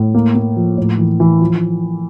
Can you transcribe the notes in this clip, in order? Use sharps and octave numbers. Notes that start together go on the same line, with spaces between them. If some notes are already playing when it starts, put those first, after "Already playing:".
Already playing: A2
A#3
A#3
F3
A2
E3
E3
F3